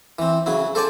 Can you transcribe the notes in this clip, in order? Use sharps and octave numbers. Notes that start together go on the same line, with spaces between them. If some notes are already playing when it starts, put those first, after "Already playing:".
E3 C4
C#3 F#3 E4
A4 C5 D5 G#5 A5